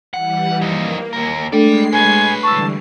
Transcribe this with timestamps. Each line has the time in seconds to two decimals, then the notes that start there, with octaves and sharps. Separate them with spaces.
0.14 E3 G3 F#5
0.62 F3 A#3 D#4
1.13 D#2 A#4
1.52 G#3 A3 D4 A4 D5 G5 C7
1.93 B4 C#5 G#5
2.43 D3 E3 G3 A5 C#6 E6